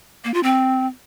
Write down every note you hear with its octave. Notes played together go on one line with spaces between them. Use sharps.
A#3
F4
C4